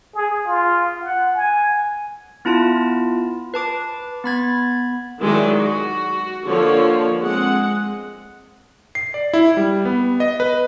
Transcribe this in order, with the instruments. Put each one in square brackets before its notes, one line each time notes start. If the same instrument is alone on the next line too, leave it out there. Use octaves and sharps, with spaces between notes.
[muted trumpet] G#4
F4
F#5
G#5
[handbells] B3 E4 F4 A5
B4 A5 D6
B3 B5 G#6 A6
[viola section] D#3 F#3 G#3 E4 D5
F#4
D3 F3 A#3 C#5
G#3 C4 F#5
[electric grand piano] C7
D5
E4
G3
B3
D#5
B4